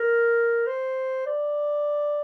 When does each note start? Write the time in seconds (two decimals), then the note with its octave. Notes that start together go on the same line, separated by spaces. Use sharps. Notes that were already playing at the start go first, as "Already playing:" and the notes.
Already playing: A#4
0.67 C5
1.26 D5